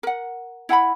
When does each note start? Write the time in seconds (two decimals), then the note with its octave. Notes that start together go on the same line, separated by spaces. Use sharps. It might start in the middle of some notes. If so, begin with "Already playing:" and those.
0.03 A#4 F#5
0.69 E4 F#5 G#5 B5